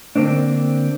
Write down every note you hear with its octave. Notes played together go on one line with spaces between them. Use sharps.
D3 A#3 C4 D4